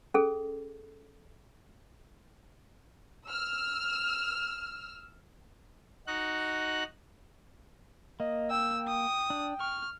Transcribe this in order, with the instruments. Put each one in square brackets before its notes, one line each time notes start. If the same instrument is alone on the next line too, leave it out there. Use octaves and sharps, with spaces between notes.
[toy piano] C#4 G#4 A4
[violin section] E6 F6
[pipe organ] D#4 F#4 F#6
[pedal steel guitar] A#3 [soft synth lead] D#5
[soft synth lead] G5 [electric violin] E6
[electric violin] D#6
[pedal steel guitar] D4
[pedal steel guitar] C#6 [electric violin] F6